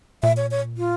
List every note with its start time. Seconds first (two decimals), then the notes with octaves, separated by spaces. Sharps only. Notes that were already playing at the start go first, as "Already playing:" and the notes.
0.23 A#2 E5
0.37 C#5
0.51 C#5
0.77 F4